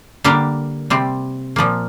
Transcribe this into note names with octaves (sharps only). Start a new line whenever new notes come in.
D3 G3 A#3 G4 A#4
C3 G3 C4
A#2 F3 A#3